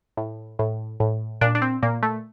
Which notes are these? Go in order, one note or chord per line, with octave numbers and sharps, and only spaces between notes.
A2
A2
A2
A#2 D4
D4
C4
A#2 A#3
A3